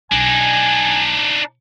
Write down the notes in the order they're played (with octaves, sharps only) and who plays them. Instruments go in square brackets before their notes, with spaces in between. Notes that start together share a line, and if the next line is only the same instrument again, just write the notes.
[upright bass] B1 [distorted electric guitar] D4 D#4 [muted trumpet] G#5